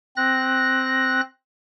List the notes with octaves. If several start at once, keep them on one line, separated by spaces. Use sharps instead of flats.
C4 F#6 A#6